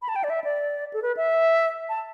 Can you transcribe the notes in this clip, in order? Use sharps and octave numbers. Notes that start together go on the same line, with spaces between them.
B5
A5
G5
D5
E5
D5
A4
B4
E5
A5